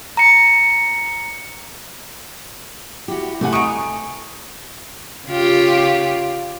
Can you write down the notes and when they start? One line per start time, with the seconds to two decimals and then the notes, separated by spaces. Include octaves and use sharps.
0.17 A#5 C#7
3.08 E4 F#4 G4
3.41 C3 A3 G4 F#5 G#5
3.53 D#4 C#6 D#6 D7
5.28 C#3 F4 G4